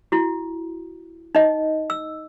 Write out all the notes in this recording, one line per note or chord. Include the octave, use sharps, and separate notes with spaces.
E4 F#4
D#4 D#5
E6